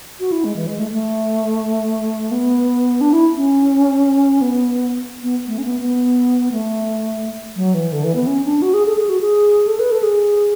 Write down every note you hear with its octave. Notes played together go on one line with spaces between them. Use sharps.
F#4
E4
G#3
E3
G#3
A3
A3
B3
D4
E4
C#4
B3
B3
A3
C#4
B3
B3
A3
F#3
E3
D3
E3
B3
C#4
D4
F#4
G#4
A4
G#4
F#4
G#4
A4
B4
A4
G#4